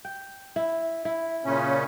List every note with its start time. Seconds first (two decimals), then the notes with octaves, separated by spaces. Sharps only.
0.05 G5
0.56 E4
1.05 E4
1.45 A#2 C#3 C#4